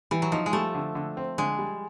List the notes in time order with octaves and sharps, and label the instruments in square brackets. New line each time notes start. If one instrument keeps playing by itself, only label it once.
[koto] E3 [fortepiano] G3
[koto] F#3
[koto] F3 [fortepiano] D#4
[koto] G#3
[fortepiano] G3 [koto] A3
[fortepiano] D3
D3
C4
[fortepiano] D3 [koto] G#3
[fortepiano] G3